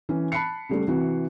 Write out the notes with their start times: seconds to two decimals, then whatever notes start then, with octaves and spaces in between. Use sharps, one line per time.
0.09 E3 C#4
0.32 A5 B5 F#6 C7 C#7
0.69 C#3 G3 A3
0.87 C3 E3 F#4